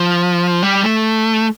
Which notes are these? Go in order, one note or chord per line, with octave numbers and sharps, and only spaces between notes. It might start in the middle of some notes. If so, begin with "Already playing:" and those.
Already playing: F3
G3
A3